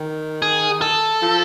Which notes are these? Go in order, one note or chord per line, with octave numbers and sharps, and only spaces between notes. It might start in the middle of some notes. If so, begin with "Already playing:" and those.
Already playing: D#3
G#4
A4
F3